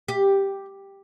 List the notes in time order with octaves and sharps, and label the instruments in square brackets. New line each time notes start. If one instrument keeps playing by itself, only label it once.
[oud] G4